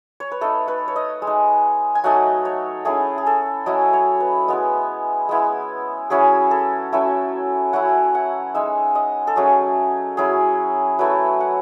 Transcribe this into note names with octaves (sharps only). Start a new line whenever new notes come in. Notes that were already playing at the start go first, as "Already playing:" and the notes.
C#5
B4
A3 D#4 A4
B4
C#5
D#5
G#3
D#4
G#5
F#3 A3 D#4 F#5
C#5
A3 C#4 E4 G#4
G#4
A4
F#3 C#4 E4 D#5
C#5
B4
G#3 B3 E4
G#3 B3 E4
F#3 C#4 E4 G#4
A4
F#3 A3 C#4 E4 E5
F#3 C#4 E4 F#5
F#5
G#3 D#4 E5
D#5
A4
F#3 A3 C#4 G#4
F#3 C#4 E4 G#4
F#3 A3 E4 B4
F#5